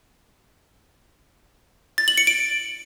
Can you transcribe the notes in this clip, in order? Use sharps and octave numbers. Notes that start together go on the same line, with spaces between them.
A6
F#7
C#7
D7